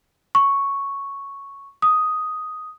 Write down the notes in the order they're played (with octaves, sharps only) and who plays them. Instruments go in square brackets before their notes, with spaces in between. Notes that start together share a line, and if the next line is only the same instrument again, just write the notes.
[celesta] C#6
D#6